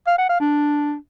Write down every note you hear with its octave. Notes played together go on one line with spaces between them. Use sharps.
F5
F#5
F5
D4